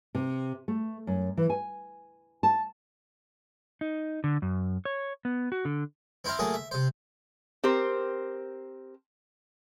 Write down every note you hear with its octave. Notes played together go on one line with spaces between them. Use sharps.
C3
A3
F#2
E3
G#5
A5
D#4
D3
F#2
C#5
B3
F#4
D3
C4 E4 C5 F5 A#5
F#3 A3 A#3 G#4
E5
C3 C5
C4 G4 A#4 C5